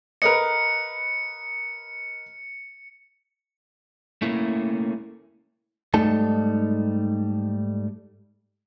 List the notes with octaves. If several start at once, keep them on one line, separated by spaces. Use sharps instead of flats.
A#4 B4 D#5 C#7
A3 A#3 C#4 E4
G#2 G3 A3 D#4 A5